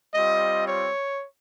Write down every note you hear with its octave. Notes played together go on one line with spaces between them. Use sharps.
G3 C4 F4 D#5
C#5